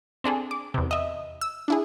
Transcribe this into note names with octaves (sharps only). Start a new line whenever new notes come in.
C4 D4 G#4 A4
D6
E2 C3
D#5 E5
E6
D4 E4 G#4